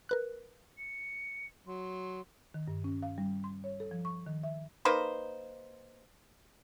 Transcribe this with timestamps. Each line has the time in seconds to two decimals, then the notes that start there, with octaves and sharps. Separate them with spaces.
0.09 A#4 B4 F#6
0.78 C#7
1.67 F#3 C6
2.54 D#3
2.68 G2
2.84 C#4
3.03 F5
3.18 G3
3.44 C6
3.64 C#5
3.80 A4
3.91 F3
4.05 C#6
4.26 D#3
4.43 E5
4.85 A#3 D#4 B4 C5